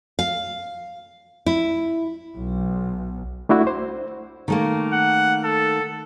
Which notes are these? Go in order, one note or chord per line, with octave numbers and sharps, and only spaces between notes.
F5
E4
B1
A3 D4 E4 F#4
C5
D#3 A3 A#3
F#5
A4